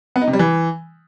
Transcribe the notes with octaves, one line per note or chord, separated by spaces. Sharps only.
B3
D#4
C3
G3
E3